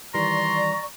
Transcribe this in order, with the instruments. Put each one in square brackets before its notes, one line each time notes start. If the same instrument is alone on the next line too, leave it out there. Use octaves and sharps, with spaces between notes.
[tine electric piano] D#3 E3 G3 [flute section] D5 C#6 [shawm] A#5 [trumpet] C6